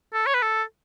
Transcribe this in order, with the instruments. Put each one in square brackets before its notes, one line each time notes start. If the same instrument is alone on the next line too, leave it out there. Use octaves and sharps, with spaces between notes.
[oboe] A4
C#5
B4
A4